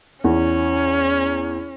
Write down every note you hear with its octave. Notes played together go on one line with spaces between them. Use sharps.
E2 C#4